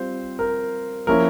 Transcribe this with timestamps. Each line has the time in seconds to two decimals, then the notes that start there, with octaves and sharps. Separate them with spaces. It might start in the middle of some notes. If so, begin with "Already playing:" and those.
Already playing: G3 C4 F4 C5
0.39 A#4
1.07 F3 A#3 C#4 E4 A#4